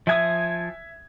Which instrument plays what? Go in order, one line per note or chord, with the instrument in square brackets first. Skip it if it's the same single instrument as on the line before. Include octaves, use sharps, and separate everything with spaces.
[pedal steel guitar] F3 G#5 D#6 [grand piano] E5 G#6